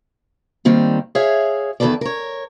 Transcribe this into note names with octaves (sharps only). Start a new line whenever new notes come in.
D#3 G3 A#3 C4
G#4 C#5 E5 F5
E2 D#3 F#3 A4 B4 D5
A#4 C#5